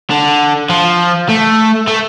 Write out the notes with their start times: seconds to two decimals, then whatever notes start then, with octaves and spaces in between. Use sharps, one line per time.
0.10 D3
0.69 F3
1.29 A3
1.88 A3